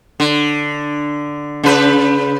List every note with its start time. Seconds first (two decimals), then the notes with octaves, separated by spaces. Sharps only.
0.20 D3
1.64 C#3 B4